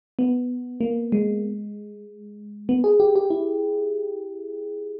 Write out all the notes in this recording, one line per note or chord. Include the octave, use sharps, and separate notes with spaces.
B3
A#3
G#3
B3
G#4
G4
G4
E4